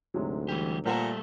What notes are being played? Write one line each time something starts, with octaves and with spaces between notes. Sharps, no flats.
D2 G#2 C3 F#3
E3 G3 G4
A#2 G3 A3 A4 A#4 C5 F#5